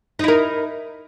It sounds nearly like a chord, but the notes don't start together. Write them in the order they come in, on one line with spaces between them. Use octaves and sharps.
D#4 E4 A#4